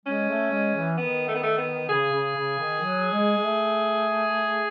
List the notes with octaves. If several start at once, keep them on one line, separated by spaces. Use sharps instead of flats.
G#3 C#4
A3
G#3
E3
D#3 B3
A3
B3
A3
B3
C#3 G#4
C#3
C#3
D#3
F#3
G#3
G#3
A3